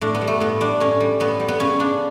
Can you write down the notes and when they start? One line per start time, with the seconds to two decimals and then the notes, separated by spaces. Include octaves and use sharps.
0.01 A2 D4
0.15 B3
0.21 G3
0.27 A3
0.40 A2 B3
0.60 G3 D4
0.80 A2 C#4
1.00 G3
1.20 A2 B3
1.40 G3
1.48 B3
1.60 C#3 C#4
1.79 C#3 D4